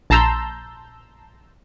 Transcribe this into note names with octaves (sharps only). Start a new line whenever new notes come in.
A#1 A5 A#5 C6 E6 G6